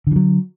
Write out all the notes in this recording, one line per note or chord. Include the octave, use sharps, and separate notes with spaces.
D3 E3 F#3